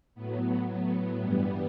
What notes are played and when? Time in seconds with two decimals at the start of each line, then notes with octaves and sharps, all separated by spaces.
0.15 A2 F#3 B3
0.68 B3
1.20 G2 E3 G3